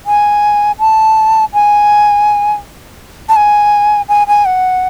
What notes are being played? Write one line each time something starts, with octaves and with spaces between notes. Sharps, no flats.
G#5
A5
G#5
A5
G#5
G#5
G#5
F#5